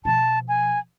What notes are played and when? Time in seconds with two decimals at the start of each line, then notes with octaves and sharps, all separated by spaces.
0.05 B2 F3 A5
0.48 G#5